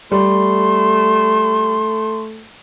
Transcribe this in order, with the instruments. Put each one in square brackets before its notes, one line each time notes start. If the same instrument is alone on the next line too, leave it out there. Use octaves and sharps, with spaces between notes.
[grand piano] G3 [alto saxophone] A3 [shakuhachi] C6